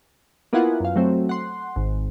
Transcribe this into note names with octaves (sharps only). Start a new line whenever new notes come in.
A#3 B3 E4 F4 F#5 G#5
F#2 F5
F#3 A3 C4
F#5 C6
G#1